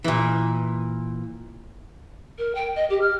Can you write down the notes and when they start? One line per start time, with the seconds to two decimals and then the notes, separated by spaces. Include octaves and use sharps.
0.04 A#2 E3
2.38 A#4
2.55 G5
2.76 D#5
2.90 G4
3.01 F6